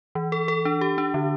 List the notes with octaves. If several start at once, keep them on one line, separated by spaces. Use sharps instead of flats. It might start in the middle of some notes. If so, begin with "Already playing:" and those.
E3
A4
A4
D4
G4
D4
D3